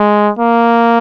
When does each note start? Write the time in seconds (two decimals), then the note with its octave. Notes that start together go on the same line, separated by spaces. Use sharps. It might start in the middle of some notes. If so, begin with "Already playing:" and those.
Already playing: G#3
0.39 A#3